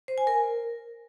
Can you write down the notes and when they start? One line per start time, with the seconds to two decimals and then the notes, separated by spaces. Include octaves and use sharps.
0.08 C5
0.18 G#5
0.27 A#4